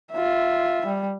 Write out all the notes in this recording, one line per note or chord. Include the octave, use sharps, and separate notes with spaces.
F4 E5
G3